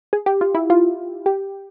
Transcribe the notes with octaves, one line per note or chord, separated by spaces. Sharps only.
G#4
G4
F4
E4
F4
G4